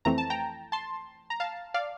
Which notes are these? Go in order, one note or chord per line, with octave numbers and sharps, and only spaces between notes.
F2 E3 A3 C4 A#5
A5
G5 A#5
A5 C6
A#5
F5 A5
D5 F5